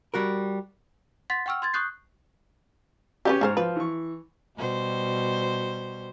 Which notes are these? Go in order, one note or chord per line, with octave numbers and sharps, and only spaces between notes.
G3 F#4 A#4
F#5 C6 A6 B6
F#5 G5 C#6 E6 F6
C6 G#6 A6
C#6 D#6 F#6 G6 C7
C#3 C#4 D#4 G4 B4
G#2 G#4 A4 C5 C#6 F6
F3 B4
E3 C#6
B2 G3 C5